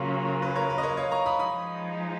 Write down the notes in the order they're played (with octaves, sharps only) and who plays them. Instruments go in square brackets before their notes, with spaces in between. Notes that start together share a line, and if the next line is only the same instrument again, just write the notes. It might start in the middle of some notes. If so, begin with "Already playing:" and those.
Already playing: [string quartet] C#3 F#3 A#3 F4 [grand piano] B4
[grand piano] A#4
B4
A#4 C#5
B4
D#5
A#4 C#5
C#5 F5
A#5 C#6
B5 D#6
[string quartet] F3 G#3 D#4 [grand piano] B5 D#6